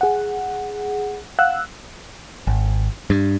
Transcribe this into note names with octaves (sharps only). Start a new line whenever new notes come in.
G#4 F#5
F5 F#5 E6 F#6
G#1
G2